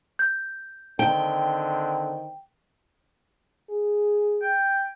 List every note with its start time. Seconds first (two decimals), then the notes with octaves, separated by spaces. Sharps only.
0.19 G6
0.99 D3 D#3 C4 G5
3.70 G#4
4.42 G5